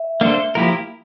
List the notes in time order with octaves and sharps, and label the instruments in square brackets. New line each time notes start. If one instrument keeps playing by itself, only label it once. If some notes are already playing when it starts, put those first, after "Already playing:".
Already playing: [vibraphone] E5
[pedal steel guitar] A#3 D4 A4 C5
F3 A#3 E4 G4 A#4